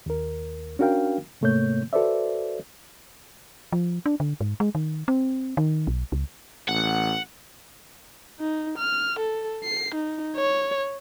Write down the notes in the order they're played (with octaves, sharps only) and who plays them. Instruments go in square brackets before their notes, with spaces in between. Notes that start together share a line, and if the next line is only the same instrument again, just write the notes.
[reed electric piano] D#2 A#4
C#4 D4 F#4 A#4 F5 G5
G#2 C3 A3 A#3 C#5 G6
F#4 A4 B4 C5 D5 E5
[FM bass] F3
D4
D3
G#2
G#3
D#3
C4
D#3
B1
C#2
[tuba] A1 [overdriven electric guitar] F#5
[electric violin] D#4
F6
A4
C7
D#4
C#5